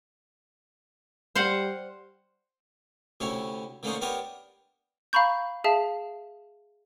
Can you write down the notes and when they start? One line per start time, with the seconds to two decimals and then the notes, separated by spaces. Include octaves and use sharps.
1.35 G3 C5 F5 F#5
3.20 D2 C3 C#4 E4 C#5
3.83 D3 A3 A#3 C#4 D#4 C5
4.01 B3 D4 G4 A#4 B4 C#5
5.13 F5 A#5 B5 C#6 G6
5.64 G#4 E5 F5 A5